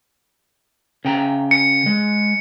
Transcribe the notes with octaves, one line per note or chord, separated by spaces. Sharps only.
C#3 G5 A#5
C#7
G#3